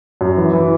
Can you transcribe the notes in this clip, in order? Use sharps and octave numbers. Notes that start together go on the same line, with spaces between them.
F#2
E3
E3